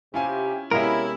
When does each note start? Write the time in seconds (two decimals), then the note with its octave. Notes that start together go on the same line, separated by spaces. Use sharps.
0.14 C3 C#4 E4 F4 G4 G#5
0.71 C3 G#3 B3 C#4 E4 F4 A#4